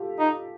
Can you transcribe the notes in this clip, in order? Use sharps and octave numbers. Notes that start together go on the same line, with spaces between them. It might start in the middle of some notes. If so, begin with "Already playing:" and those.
Already playing: F4 G4 A4
D#4